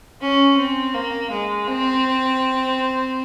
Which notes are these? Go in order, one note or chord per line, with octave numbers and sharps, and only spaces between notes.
C#4
C4
A#3
G#3
C4